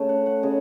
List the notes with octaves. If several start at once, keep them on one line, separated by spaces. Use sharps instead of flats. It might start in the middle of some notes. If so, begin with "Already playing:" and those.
Already playing: C#3 A3
F#5
F#5
C#3 D#5